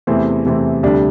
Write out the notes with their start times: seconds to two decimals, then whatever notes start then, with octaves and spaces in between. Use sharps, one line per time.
0.07 E2 C3 E3 A3 C4
0.45 E2 C3 E3 A3 C4
0.83 D2 C3 G3 D4